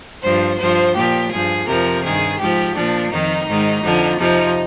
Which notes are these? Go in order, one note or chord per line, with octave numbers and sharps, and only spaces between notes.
G2 F3 C5
G2 F3 C5
A#2 F3 G4
G2 F3 G#4
F2 C3 F3 A#4
G2 D#3 G#4
G#2 F3 G4
A#2 F3 D4
F2 D#3 D#4
G#2 D#3
F2 D3 F3
F2 C3 F3 D#4